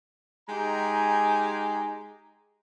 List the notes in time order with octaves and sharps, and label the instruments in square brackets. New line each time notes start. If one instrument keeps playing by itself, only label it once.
[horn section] G#3 D#4 G4 G5 G#5 A#5